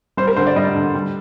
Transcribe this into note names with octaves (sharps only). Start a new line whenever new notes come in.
G3 C5
A#4
D3 C5
D5
G3 D#5
D3
G3